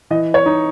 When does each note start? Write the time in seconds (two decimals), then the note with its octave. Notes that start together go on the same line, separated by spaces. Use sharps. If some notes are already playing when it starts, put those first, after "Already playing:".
0.10 E3 D#5
0.34 C#5
0.46 D#4